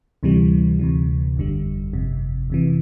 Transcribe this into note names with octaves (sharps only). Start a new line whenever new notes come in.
D2 C3 E3 G3
D2 C3 E3
G1 F2 D3 G3
G1 F2 C3
F2 C3 E3